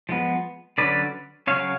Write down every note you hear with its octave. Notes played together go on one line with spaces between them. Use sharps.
F3 G#3 B3
D3 F#3 C#4 B4 D5
C#3 F#3 C#4 C#5 F5